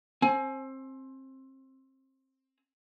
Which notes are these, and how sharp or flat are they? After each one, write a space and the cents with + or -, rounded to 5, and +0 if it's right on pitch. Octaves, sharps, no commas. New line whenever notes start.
C4 +25 G#5 +25